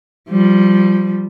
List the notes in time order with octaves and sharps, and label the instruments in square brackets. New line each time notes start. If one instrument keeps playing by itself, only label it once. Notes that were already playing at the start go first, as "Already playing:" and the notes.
[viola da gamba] F3 G3